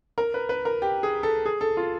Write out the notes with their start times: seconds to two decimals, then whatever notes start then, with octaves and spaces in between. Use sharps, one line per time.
0.18 A#4
0.34 B4
0.49 B4
0.65 A#4
0.82 G4
1.03 G#4
1.23 A4
1.46 G#4
1.61 A4
1.77 F4